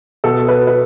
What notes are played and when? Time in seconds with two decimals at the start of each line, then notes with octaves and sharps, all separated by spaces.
0.24 B2 A4
0.48 B4
0.67 B4